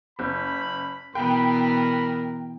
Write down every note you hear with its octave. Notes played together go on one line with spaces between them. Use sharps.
F#1 B5
B2 E3 B3 A#4 G5 B5